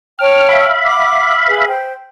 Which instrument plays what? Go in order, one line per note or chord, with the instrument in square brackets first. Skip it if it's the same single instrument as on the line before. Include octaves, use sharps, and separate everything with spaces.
[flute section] C#5 G5 A5 [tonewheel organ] F6
[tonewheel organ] E5 F5 B5
[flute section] F#5 D6
G#4 B4
C5 G5